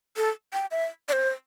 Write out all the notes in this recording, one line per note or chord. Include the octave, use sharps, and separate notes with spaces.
A4
G5
E5
D5
C5